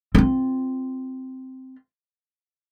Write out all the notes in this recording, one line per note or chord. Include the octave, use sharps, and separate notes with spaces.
C4 F4